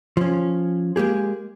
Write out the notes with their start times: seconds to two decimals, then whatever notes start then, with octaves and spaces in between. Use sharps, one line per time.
0.17 F3 C#4
0.96 G#3 A#3 G4 G#4